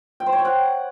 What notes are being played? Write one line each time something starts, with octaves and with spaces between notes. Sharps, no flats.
G5
C5
C#5
G5
F#5